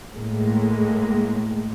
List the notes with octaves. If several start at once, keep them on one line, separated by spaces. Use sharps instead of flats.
A2 G#3 A#3